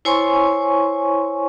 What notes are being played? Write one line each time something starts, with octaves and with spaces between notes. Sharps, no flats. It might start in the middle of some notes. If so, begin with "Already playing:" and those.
E4 C5 C#5 G#5 C6 C#6